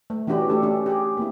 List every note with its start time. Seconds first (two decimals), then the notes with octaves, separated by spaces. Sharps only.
0.10 A3
0.27 E3 C#4 D4 F#4 G4 B4
0.49 A3 D4 G4 A4
0.62 A3 C#4 D4 G4
0.86 G4 G#4
1.17 A#3 C4 E4